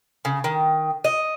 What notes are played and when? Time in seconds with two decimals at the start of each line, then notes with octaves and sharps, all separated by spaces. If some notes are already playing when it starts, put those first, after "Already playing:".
0.25 C#3
0.44 D#3
1.04 D#5